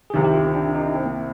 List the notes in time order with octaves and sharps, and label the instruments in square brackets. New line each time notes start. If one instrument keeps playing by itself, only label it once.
[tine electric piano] G#4
[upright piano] C2 C3 D#3 [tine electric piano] G4
[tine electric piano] G4
F4
C4
D4
D#4
C4
A#3